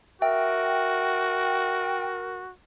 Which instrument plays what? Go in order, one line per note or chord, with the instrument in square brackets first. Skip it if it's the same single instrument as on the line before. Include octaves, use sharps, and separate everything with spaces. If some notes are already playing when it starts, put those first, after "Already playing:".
[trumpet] F#4 [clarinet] A#4 [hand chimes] E5 [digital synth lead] G5